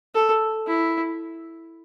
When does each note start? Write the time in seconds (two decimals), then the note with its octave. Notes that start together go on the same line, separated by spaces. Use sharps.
0.15 A4
0.67 E4